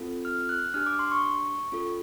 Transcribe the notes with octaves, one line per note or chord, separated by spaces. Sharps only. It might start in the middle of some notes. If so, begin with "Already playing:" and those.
Already playing: C4 F4 A4
F6
F#6
D4 G4 F6
D6
C6
C#6
C#4 F4 A4